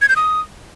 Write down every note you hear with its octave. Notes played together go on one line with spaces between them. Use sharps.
G#6
G6
D#6